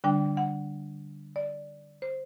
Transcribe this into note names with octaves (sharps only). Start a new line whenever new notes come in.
D3 G3 D4 G5
F#5
D5
C5